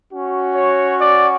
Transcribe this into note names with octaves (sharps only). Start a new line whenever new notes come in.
C#4 F#4
C#5
D5